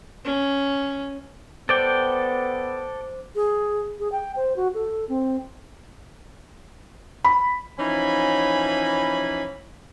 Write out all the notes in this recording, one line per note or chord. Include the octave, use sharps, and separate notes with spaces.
C#4
B3 A4 C5 D5 G5 D6
G#4
G#4
G5
C5
F#4
A4
C4
B5
E3 F3 C#4 D#4 G#5 B5